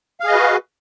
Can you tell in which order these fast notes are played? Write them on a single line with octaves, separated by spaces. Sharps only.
F5 G#4 D#5 B4 F#4